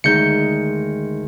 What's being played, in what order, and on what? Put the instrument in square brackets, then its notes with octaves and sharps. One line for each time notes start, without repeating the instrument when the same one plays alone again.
[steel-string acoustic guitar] D2 D#3 G#3 [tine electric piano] D#4 G6 C#7